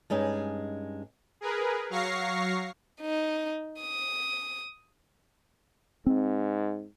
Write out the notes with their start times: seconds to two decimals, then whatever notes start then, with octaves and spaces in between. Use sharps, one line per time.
0.10 G2 G#3 C#4 D#4
1.41 G#4 A#4 B4
1.90 F#3 F5 C#6 A#6 C7
3.01 D#4
3.81 D#6
6.07 G#2 C4